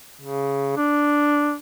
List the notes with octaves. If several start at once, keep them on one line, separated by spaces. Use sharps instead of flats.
C#3
D4